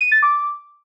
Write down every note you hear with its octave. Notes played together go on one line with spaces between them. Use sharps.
D#7
A6
D6